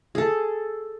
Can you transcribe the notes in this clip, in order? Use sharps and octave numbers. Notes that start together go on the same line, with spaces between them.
G#4 A4